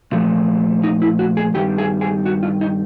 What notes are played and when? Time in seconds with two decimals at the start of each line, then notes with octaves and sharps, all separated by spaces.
0.12 A#2 F3 A3
0.84 D#4
1.02 E4
1.19 F#4
1.37 G#4
1.54 G2 D#3 G3 G4
1.78 G#4
2.01 G#4
2.26 F#4
2.43 F4
2.61 D#4